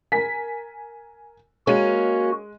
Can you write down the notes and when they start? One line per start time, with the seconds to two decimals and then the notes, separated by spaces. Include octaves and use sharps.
0.12 A#4 G#5 B6
1.67 G#3 A#3 C#4 F#4 D#7